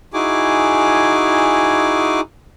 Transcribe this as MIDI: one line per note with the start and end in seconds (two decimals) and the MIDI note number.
0.14 2.21 63
0.14 2.21 64
0.14 2.21 66
0.14 2.21 68
0.14 2.21 80
0.14 2.21 86